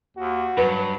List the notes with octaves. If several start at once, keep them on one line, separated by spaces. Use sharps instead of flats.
D#2 F#4
G2 F#3 B4